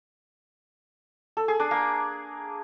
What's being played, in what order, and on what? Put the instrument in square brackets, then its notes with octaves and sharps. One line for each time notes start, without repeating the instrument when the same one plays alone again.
[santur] A4
G#4
D4
A#3